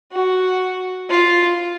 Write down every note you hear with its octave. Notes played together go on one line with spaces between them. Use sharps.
F#4
F4